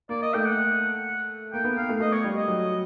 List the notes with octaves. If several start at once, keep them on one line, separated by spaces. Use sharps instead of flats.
A#3 D5
D#5
A3 G5
F#5
A#3 G5
B3
A#3 F5
A3
A3 D#5
C#5
G3
D#5
F#3